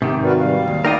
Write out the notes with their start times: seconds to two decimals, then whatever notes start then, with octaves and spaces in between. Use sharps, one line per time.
0.02 G#2 C3 D#3 G4
0.23 F#4 A#4 B4 D5
0.38 G3 F5
0.68 D#2
0.85 A3 D#4 E4 A#4 D5 D#5 G5